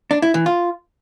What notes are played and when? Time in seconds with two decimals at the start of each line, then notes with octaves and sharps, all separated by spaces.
0.11 D4
0.22 E4
0.34 E3
0.46 F4